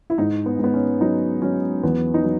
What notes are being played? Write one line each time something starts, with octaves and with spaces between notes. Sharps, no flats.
E4
G#2 D#4
B3
G#2 B3
C#4
F#3 D#4
F#3 C#4
E2 B3
D#4
F#3